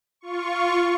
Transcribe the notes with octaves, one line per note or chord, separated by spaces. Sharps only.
F4 C#6